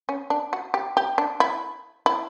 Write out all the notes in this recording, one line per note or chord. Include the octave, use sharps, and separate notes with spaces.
C#4
D4
F#4
G4
G4
D4
E4
E4